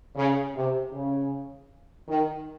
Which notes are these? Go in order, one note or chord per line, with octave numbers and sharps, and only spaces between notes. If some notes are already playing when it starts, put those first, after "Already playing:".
C#3
C3
C#3
D#3